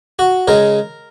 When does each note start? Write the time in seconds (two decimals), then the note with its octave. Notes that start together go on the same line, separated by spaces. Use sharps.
0.19 F#4
0.48 C#3 G#3 A#4